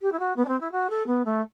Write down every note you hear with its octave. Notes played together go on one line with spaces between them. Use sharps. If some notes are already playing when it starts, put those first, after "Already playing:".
G4
E4
F#4
B3
D4
C4
E4
F#4
A4
B3
A3